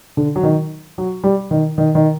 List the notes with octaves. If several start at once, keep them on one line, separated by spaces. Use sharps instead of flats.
D3
F#3
D#3
F#3
G3
D#3
D#3
D#3